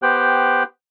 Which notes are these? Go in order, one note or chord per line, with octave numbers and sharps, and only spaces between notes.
B3 G4 C5 G5 F#6